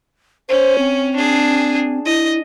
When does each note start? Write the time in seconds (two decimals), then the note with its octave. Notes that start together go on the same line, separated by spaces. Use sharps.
0.49 C#4 C5
0.78 C4
1.16 D4 G#4
2.05 E4 D#5